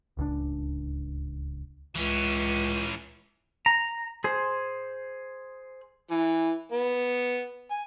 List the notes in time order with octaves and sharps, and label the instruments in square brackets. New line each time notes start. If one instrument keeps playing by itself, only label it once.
[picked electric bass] D1 C#2 B2 D4
[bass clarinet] C#2 [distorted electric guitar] E3 C#4
[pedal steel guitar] A#5
G#4 C5
[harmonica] E3
B3
G#5